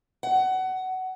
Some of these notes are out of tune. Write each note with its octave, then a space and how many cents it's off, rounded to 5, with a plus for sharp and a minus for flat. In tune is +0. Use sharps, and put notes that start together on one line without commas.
F#5 +20